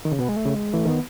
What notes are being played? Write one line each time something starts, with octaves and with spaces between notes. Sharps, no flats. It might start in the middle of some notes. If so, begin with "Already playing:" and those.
D#3
C#3
B2 B3
G#3
A3
C#3
G#3
E3 A3
D#3 B3